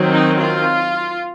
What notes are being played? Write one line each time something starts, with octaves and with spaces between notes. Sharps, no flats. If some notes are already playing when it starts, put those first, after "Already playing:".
Already playing: D#3 F#3 C4
D#4
F4